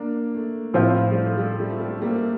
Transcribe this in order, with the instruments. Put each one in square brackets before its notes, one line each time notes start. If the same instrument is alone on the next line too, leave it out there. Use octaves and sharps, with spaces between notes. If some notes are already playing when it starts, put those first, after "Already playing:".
Already playing: [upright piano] A#3 D4
A3
[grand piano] A2 F3 C4 F4
[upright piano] G3
A3
G3
A3
G3
A3
G3
A3
G3 A#3
A3